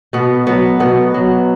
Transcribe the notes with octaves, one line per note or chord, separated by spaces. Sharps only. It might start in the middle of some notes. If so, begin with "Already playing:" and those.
B2 B3
F#3 B3
B2 B3
F#3